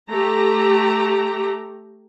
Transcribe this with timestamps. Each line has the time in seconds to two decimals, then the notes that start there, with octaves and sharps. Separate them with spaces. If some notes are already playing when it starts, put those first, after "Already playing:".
0.10 A3 G4 A#5